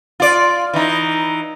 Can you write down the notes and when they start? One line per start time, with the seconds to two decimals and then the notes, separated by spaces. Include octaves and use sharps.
0.20 F4 D5
0.73 E3 D#4